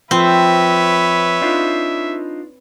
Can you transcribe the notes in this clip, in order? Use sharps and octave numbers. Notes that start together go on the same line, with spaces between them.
F3 C4 B4 C#5 E5
D4 D#4 F4